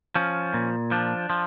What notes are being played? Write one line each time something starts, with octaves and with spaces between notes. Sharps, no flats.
F3 C#4
A#2
F3 D4
F3